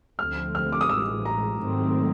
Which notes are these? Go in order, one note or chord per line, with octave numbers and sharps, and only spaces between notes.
D2 D3 F3 A3 C4 F6
F6
D6
D#6
A1 A2 E3 G#3 E6
A#5
G#2 D#3 F#3 A3 C4